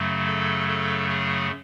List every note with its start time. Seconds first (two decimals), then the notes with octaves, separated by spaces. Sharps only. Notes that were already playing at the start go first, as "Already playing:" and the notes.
Already playing: F#2 C#3 F#3 A3
0.27 A4
0.68 A4
1.09 G#4